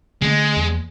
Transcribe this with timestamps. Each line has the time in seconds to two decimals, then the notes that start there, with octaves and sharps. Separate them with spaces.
0.22 D3 G#3 A3 C#4
0.57 E2